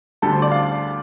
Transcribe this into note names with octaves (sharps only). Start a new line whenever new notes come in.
D2 D3 G3 A4
C5
D5
F5